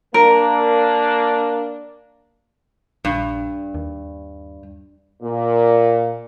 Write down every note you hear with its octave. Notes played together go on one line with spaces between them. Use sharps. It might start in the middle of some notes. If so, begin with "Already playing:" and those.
A#3 D4 A#4
A#1 G2
D#2
A#2